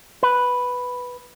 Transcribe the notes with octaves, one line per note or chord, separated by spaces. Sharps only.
B4